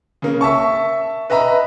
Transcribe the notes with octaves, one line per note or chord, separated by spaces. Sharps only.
C#3 A#3
E5 A5 C#6
B4 D#5 E5 A#5 B5